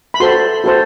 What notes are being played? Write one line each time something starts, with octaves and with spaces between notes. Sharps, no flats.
B5
F#4 A4 C5 C6
F#4 A4 C5